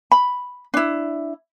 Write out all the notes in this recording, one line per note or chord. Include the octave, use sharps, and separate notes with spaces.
B5
D4 E4